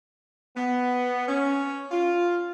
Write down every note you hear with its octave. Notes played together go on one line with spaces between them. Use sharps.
B3
C#4
F4